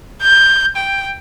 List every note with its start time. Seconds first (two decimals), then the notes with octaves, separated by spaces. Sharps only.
0.21 G6
0.76 G5